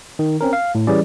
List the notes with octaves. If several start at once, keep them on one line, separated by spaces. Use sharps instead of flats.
D#3
C4 C#4 A#4
F5
A2
E3 G3 C#4 G#4 D5